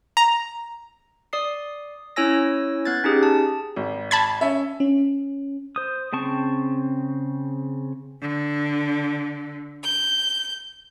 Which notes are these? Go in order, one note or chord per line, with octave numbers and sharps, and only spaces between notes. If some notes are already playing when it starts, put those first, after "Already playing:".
A#5
D5 D#6 C7
C#4 E4 C#5 G#5 E6 A#6
B3 F#6 G#6 A6
C#4 D#4 G4 G#4
A5
G#1
A5 B5 G#6
C#4 E5
C#4
C5 D#6
C#3 C4 A5 C#6
D3
G6